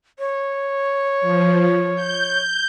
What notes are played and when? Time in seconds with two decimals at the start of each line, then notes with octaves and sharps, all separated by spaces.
0.19 C#5
1.21 F3
1.95 G6